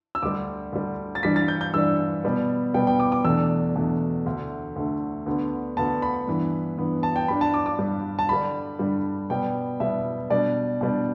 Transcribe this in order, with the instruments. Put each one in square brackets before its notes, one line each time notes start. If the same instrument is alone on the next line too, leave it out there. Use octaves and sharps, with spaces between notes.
[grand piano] E6
D2 D3 G3 D6
D2 D3 G3
A6
G2 E3 G3 D4 B6
A6
G6
G6
G2 E3 G3 D4 E6
B2 G3 B3
B2 G3 B3 G5
G5
D6
D6
E2 B2 A3 D4 E6
E2 B2 A3 D4
D2 D3 A3
D2 D3 A3
D2 D3 B3
D2 D3 B3 A5
B5
G2 E3 B3
G2 E3 B3
A5
G5
G2 G3 D4 B5
A5
D6
D6
G2 G3 D4
A5
G2 D3 G3 B5
G2 D3 G3
B2 G3 B3 G5
B2 G3 B3 E5
B2 G3 D4 D5
B2 G3 D4